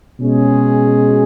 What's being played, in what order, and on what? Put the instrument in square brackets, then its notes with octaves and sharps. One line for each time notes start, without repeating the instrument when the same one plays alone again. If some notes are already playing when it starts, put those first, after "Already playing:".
[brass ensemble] B2 G#3 C#4 G#4